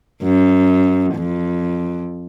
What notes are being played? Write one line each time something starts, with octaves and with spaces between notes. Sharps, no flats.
F#2
F2